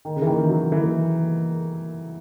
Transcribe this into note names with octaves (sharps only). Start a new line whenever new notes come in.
D#3
C#3
E3
D#3
D#3
F#3
E3